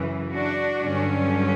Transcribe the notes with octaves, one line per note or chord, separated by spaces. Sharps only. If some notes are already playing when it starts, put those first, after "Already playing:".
Already playing: F#2 C#3 E3
D4 F#4
G2 D3 F#3 C#4